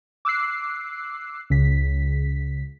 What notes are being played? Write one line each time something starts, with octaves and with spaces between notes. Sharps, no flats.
D6 E6 F#6 C7
C#2 C#3 B6